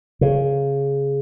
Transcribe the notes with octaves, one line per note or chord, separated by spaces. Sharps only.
C#3